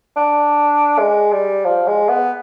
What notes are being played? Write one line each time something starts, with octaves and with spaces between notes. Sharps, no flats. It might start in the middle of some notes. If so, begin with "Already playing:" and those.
D4
G#3
G3
F3
G#3
B3